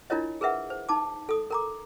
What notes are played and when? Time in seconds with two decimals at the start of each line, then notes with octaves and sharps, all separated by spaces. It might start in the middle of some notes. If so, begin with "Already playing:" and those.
0.10 D4 E4 F4 A#4 C#5 D#5
0.41 G#4 A#4 B4 E5 F#5
0.70 C5
0.89 D#4 A5 D6
1.29 A4 D#6
1.51 A#4 A#5 D6